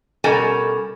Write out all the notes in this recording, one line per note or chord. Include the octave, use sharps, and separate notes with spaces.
B2 G3 C#4 A4 A#4 G#5